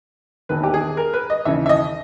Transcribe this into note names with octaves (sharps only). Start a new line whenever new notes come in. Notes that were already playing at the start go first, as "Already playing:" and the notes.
E1 D#2 D#3 B4
G4
G#4
A#4
B4
D#5
D#2 C#3 E3 E5
E5
D#5